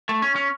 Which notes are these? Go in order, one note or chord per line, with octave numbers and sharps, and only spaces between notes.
A3
C#4
C#4